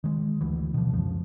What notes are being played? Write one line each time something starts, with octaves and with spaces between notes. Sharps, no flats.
D#3 G#3
D2 E3
B2 F3
C#2 F#2 F3